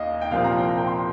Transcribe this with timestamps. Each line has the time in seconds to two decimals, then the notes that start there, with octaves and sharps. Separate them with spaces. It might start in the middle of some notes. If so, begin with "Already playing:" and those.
Already playing: D#2 D#5 F5
0.21 G5
0.31 C2 A#2 F3 C4 F5
0.44 A#5
0.58 G5
0.69 A#5
0.78 G5
0.87 C6